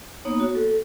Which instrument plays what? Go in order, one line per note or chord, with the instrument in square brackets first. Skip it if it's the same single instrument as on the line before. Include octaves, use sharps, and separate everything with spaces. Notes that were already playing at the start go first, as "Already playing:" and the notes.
[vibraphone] A#3 B3 D#4 C#5
F#4
A4